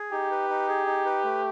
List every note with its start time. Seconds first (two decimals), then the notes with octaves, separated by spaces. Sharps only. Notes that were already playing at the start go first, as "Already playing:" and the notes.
Already playing: G#4
0.12 D#4 G4
0.31 B4
0.50 D#4
0.68 G#4
0.86 D#4
1.05 B4
1.24 A3